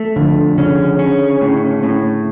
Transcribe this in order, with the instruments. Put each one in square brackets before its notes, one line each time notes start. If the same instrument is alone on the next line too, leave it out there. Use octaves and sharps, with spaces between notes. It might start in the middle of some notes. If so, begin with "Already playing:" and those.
Already playing: [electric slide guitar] A3
[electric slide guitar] F2 [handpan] D3
[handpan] C#3 [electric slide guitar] C#4
[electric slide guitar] C#4
A2
A2